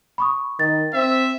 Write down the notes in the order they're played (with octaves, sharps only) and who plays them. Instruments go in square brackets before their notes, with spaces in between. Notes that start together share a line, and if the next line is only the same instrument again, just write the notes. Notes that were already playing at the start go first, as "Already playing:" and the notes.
[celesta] B5 C#6 D#6
[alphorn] D#3 [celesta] A6
[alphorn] C4 [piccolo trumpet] E5